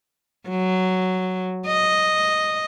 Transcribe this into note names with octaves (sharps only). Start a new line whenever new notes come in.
F#3
D#5